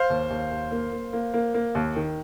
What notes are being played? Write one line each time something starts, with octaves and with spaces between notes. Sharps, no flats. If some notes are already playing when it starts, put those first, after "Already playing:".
Already playing: C5 F5
D#2
D#2
D#2
A#3
A#3
A#3
A#3
A#3
D#2
D#3